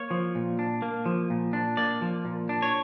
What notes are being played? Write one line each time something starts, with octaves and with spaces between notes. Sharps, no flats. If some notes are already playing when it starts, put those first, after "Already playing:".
Already playing: A#3 C#5
F3
A#2
D4
A#3
F3
A#2
D4
A#3 D5
F3
A#2
D4
C#5